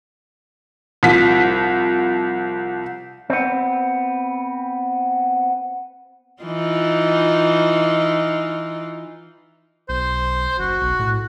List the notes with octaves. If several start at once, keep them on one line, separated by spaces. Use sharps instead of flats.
C2 F3 B6
B3 C4
E3 D#4 F4
B1 C5
F#1 F#4
B1
A2